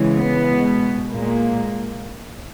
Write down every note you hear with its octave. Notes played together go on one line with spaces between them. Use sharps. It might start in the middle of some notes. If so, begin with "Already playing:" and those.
Already playing: C#3 E3 G#3
B3
B2 G#3
A#2 G#3 A#3